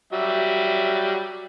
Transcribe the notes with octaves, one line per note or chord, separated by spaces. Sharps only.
F#3 G3 E5